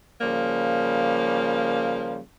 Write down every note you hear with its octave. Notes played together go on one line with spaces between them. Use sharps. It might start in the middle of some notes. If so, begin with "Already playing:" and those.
C#3 F3 G3 A#3